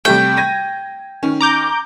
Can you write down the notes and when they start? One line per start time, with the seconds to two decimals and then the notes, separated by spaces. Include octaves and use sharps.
0.05 C3 G3 A3 G5
0.37 G#6 A#6 D#7
1.23 D#3 C#4
1.41 A#5 D6 G6